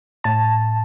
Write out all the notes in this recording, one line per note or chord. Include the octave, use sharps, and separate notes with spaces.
A2 A5